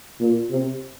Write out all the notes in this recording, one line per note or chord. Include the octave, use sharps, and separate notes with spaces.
A#2
C3